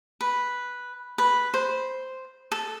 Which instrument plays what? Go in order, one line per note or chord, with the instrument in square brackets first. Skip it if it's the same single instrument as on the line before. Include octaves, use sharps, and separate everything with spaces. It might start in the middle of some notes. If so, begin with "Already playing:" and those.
[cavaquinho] B4
B4
C5
A4